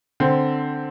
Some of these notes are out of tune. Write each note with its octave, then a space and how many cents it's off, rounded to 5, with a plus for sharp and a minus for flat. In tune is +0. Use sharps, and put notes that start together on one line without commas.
D3 +10 C4 +0